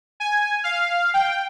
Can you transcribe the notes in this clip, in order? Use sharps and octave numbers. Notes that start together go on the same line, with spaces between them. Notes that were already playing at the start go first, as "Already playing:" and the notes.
G#5
F5
G5